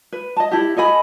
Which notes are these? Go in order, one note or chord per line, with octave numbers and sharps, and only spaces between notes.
B4
D#5 A5
E4 G4
A4 D#5 G#5 B5